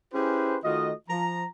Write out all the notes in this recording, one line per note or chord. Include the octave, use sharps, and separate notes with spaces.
C#4 E4 G4 G#4 B4 C5
D#3 A3 F4 F#4 D#5
F3 A#5